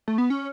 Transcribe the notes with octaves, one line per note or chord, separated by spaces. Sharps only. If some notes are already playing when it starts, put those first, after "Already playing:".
A3
B3
C#4